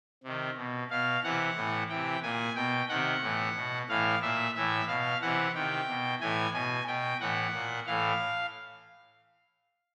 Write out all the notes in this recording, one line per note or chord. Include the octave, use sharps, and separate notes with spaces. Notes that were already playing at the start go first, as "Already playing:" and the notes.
C3 D#3
B2
B2 F5
C3 E3 F#5
A2 E3
C3 E3 G5
A#2 G#5
B2 G5
C3 D#3 F#5
A2 E3
B2
A2 E3 F5
A#2 E5
A2 E3 E5
B2 F5
C3 E3 F#5
C3 D#3 G5
B2
A2 E3 G#5
B2 G#5
B2 G5
A2 E3 F#5
A#2
A2 E3 F5